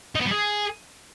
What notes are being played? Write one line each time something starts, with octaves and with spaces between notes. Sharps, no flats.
D#4
B3
G3
G#4